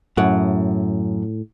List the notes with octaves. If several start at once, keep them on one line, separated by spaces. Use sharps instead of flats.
F#2 A2 F#5